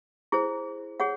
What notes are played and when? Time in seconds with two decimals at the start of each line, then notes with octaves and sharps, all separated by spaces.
0.32 E4 G#4 C5
1.00 G#4 C#5 F#5